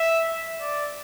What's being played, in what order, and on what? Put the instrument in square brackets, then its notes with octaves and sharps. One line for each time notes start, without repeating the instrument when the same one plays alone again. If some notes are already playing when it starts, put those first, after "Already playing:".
Already playing: [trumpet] E5
D5